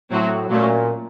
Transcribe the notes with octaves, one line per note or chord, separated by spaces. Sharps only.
A2 F#3 C4 F#4
A#2 F#3 A3 C#4